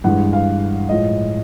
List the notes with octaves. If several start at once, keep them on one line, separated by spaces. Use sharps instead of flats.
G2 E3 G#3 F#5
F5
A2 F3 G#3 D#5